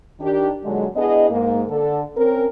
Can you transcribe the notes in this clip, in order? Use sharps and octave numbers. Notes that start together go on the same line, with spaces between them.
D#3 D4 G4
A#2 D3 F#3 G#3
B3 D4 E4 G#4 D#5
G#2 A#3
D3 A4
C4 C#4 A#4